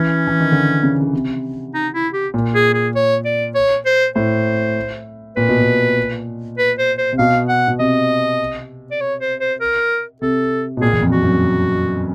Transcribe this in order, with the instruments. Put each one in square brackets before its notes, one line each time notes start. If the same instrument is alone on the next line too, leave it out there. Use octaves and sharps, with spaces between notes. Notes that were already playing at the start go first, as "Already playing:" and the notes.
Already playing: [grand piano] E3 [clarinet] C#4
[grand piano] E3
D#3
D3
C#3
C#3
C3
[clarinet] D#4
E4
G4
[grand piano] A#2
[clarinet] G#4
G#4
C#5
D5
C#5
C5
[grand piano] A2 [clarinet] C5
[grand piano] A#2 [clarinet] B4
[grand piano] B2
A#2
[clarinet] B4
C5
C5
[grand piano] C3
[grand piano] B2 [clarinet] F5
[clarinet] F#5
[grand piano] B2
[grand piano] C3 [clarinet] D#5
[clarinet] D5
C#5
C5
C5
A#4
[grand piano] C3 [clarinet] A4
[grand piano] B2
[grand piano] A#2 [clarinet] G#4
[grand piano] E2
F2
[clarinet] F#4
[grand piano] F#2